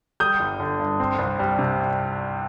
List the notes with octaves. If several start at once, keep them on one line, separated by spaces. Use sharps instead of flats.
G3 D#6 G6
G1
D3
G2
C4
C2
G3
C3